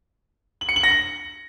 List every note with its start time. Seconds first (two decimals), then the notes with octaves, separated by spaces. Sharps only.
0.61 F#7
0.69 C#7
0.76 F#7
0.83 A#6
0.91 F#7